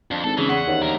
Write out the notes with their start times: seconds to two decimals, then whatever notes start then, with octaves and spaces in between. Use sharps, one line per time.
0.11 F2 D4
0.24 G#1 A4
0.37 C#3 E3
0.49 E2 E5 F#5 C6
0.67 D#2
0.82 D2 A#4